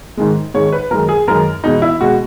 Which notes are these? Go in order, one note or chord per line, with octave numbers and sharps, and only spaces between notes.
G#2 D#3 G#3
G#2 D#3 G#3 C#5
B4
F#2 D#3 G#3 A#4
G#4
F#2 D#3 G#3 A#4
E2 B2 G#3 D#4
E4
B2 G#3 F#4